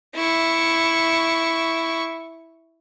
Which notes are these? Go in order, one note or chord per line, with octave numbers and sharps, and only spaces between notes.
E4 C#6